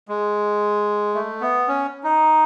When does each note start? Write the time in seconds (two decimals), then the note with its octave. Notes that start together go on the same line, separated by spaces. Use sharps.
0.08 G#3
1.15 A3
1.41 B3
1.68 C#4
2.03 D#4